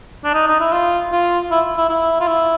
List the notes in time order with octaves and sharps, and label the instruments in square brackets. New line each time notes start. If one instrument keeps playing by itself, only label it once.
[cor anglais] D4
D#4
D#4
E4
F4
F4
E4
E4
E4
F4
E4